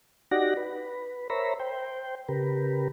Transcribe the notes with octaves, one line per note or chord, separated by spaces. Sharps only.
D#4 F#4 G4 D5 F#5 A#6
B4
A#4 C5 C#5 E5 A#5 B5
C5 G5
C#3 G4 A#4 B4